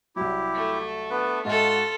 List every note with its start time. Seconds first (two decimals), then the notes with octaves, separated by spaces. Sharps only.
0.16 C2 F#3 E4 G4
0.54 A3
1.10 B3 D4 B4
1.45 G#2 F4 F#4 A4 D#5 E5 A5